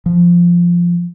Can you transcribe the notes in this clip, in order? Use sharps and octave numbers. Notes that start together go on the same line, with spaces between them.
F3